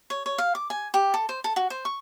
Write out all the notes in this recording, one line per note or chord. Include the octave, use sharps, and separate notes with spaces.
C#5
C#5
F5
D6
G#5
G4
A4
C5
A4
F#4
C5
C#6